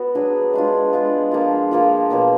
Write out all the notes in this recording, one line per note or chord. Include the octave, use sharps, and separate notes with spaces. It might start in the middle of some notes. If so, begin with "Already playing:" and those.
Already playing: B3 F#4
F#3 D4 G#4
G#3 D4 F4
G#3 D4 F4
F3 A#3 F4
F3 A#3 F4
B2 F#3 A#3